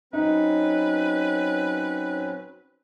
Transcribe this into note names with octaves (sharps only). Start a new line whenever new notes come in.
F#3 C4 C#4 D#4 B4